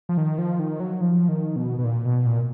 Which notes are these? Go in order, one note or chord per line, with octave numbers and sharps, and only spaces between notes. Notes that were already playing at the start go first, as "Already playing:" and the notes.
F3
D#3
F3
D#3
F#3
F3
D#3
B2
B2
A#2
B2
A#2